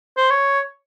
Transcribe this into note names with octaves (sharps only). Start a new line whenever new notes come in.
C5
C#5